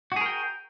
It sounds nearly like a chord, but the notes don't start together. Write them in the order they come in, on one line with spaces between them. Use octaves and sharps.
F#4 G#4 A#4 G5